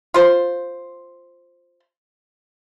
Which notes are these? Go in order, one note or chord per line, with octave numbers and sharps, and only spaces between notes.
F4 C5